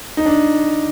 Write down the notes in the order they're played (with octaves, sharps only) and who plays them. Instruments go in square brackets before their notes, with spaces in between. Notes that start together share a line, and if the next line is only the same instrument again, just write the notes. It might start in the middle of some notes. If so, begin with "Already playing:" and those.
[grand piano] D#4
D4